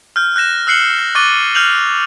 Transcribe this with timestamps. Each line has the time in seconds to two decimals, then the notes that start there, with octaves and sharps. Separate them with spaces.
0.16 F6 G6
0.36 F#6 G6 A#6 E7
0.67 E6 F#6 C7 C#7 F#7 G7
0.98 A#6
1.15 C#6 D6 F#6 A6 D#7 G7
1.55 F6 G6 F7 F#7